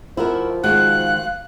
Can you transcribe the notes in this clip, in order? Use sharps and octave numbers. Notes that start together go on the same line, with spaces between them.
F3 E4 F#4 A#4
D#3 G#3 F#4 F5 F#6